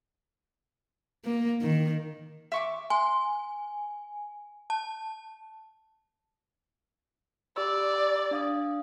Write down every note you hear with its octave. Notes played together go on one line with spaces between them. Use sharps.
A#3
D#3
E5 C#6 D6
G#5 C6
A5
G4 D5 E6
D4 F5 D#6